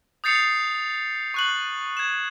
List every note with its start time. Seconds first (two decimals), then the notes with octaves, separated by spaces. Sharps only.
0.24 D#6 G6 A6 C7 C#7 F7
1.34 C#6 F#6 F#7
1.97 G#6 E7